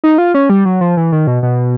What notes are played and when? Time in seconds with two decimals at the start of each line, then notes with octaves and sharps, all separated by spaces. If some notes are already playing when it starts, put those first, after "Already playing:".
0.04 D#4
0.18 F4
0.34 C#4
0.50 G3
0.65 F#3
0.81 F3
0.97 E3
1.12 D#3
1.27 B2
1.43 B2